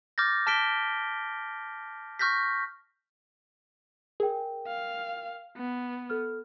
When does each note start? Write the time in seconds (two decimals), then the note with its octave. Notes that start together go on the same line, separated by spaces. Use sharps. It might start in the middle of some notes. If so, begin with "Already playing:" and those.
0.18 D6 F6 G6 A6 A#6
0.47 A5 F6 B6 D7 G7
2.19 C#6 F6 G6 A#6 B6
4.20 G#4 A#4 G5
4.67 F5
5.57 B3
6.10 A4 F6